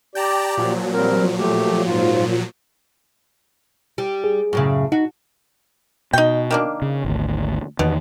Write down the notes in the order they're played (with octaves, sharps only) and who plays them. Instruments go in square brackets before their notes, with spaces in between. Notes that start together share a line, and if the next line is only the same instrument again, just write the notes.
[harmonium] G4 D5 [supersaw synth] G5 A5 A#5
[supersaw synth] A#2 F3 F#3
[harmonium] G3 C4 A#4
A3 G4
G#2 F4
[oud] G3
[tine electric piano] G#4
[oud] F#2 A2 C#3
[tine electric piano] D#4 [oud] F#4
[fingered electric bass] B2 [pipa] D#4 G5
[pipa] D#3 A#3 D4
[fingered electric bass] C#3
G#1 D2
[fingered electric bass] E2 D#3 [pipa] B2